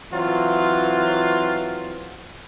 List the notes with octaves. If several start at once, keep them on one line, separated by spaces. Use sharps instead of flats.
E3 F#3 C4 F4